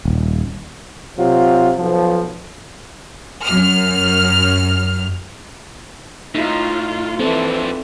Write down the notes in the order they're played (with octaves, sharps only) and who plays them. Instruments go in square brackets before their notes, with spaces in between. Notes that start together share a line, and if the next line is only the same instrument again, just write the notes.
[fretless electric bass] D#1
[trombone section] C3 F#3 F4
B1 F3
[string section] F#2 F6
[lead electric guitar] A2 [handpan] D#4 [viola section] F4
[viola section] E3 [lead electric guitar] F3 D4 [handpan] C4 A4 C5